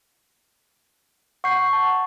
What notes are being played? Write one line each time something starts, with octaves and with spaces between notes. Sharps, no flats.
F#5 C#6 G6 C7
A5